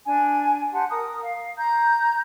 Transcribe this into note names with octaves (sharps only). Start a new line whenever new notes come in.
D4 G#5
G4 F#5 A5 C6
A#4 A#5 D#6
F5
A#5 G6